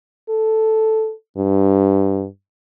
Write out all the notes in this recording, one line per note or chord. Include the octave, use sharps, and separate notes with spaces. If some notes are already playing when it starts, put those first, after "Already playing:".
A4
G2